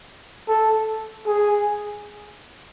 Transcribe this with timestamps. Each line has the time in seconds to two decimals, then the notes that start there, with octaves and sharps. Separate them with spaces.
0.48 A4
1.27 G#4